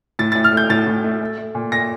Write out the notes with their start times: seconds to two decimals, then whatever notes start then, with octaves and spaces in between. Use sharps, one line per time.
0.19 A2 A6
0.32 A2 A6
0.44 F6
0.53 A3 G6
0.70 A2 A6
0.87 A2
1.04 A3
1.21 A3
1.38 A3
1.55 A#2
1.72 A#2 A#6